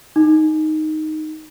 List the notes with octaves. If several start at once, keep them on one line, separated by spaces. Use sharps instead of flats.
D#4